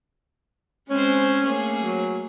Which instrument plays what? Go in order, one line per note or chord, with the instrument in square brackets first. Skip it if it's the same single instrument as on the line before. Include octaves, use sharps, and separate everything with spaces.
[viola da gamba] G#3 C4 C5 [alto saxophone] C#4
[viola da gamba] A3 A#3 G#4
[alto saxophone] F#3